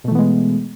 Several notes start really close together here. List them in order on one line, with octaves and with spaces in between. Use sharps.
B2 A3 E3 B3 G#3